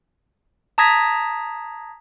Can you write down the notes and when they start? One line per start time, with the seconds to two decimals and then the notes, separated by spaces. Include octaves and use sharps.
0.78 A5 A#5 D#6 G#6 A#6 B6